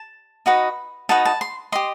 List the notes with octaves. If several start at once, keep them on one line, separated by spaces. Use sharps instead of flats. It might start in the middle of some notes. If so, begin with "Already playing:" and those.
Already playing: A5
D#4 F#4 B4 D#5
D#4 F#4 B4 D#5 A5
A5
C6
G4 D#5 C6